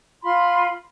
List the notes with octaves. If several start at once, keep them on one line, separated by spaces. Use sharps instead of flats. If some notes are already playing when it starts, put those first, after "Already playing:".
F4 B5 C6